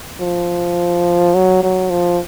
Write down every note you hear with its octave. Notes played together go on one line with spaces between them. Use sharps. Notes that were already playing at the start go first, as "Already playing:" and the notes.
F3
F#3
F#3
F3